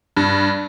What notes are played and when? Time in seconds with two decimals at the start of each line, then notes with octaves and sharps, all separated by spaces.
0.17 G2